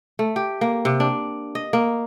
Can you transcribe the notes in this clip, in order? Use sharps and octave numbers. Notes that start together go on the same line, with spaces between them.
A3
G4
A#3
C3
D4
D#5
A#3